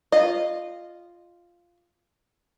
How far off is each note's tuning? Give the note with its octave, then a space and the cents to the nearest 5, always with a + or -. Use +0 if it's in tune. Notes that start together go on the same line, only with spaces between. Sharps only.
F4 -5 D#5 -25